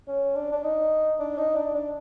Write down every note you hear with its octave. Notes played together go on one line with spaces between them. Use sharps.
C#4
D4
D4
D#4
D4
D#4
D4
D4